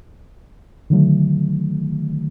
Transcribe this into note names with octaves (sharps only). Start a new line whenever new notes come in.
D3 D#3 F#3 A3